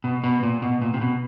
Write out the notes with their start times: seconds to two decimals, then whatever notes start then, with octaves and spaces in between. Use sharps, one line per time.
0.04 B2
0.24 B2
0.43 A#2
0.62 B2
0.82 A#2
0.94 C3
1.01 B2